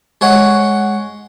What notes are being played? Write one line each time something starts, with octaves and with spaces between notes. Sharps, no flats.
G#3 C#5 F#5